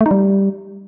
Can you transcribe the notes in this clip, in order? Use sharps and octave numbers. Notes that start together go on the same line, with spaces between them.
A3
D#4
G3